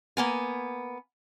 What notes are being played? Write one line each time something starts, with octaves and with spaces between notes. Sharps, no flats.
A#3 B3 G#5